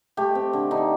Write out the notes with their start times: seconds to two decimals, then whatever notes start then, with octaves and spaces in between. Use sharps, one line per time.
0.17 A3 G4
0.35 C4
0.53 D3
0.71 D3 D#4